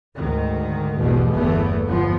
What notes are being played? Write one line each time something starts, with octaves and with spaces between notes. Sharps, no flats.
D2 G#2 D#3
A#1 E2 G#2 B2 G3 A3
G1 E2 G2 E3 A3 B3
G1 A2 F3 B3